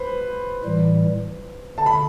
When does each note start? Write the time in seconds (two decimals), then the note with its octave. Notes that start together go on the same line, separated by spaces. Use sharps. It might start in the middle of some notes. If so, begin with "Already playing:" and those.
Already playing: B4 C5
0.65 A2 E3 G3
1.78 D3 A5
1.86 B5